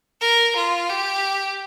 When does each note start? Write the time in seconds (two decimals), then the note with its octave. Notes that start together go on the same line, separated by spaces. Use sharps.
0.21 A#4
0.56 F4
0.90 G4